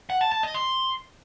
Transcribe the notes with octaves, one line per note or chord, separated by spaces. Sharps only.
F#5
A5
A5
D#5
C6